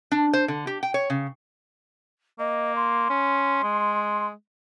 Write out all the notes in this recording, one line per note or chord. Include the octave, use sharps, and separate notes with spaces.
D4
C5
D3
G4
G5
C#5
C#3
A#3 D#5
C6
C#4
G#3